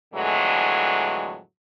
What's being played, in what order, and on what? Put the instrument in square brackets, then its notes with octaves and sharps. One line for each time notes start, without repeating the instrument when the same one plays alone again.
[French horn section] F2 A2 D3 E3 F#3 G#3